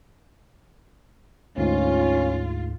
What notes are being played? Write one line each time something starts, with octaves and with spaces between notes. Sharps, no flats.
D2 G#2 C#4 F4